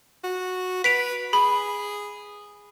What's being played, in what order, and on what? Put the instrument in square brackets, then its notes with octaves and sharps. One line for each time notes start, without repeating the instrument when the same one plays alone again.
[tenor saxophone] F#4
[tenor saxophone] B4 [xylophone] B6 D7 F7
[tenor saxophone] G#4 [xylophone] B5